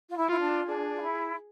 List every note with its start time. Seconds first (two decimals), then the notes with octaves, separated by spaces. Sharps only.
0.09 F4
0.17 E4
0.29 E4 F4
0.41 D4
0.66 D4 G#4
0.94 F4
1.01 E4